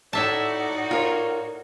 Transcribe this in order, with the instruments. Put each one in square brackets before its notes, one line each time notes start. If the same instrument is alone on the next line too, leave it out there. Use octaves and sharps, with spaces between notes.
[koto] A2 E5 A5 [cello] D#4 F#4 [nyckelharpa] D5
[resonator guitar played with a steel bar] F4 A#4 C#5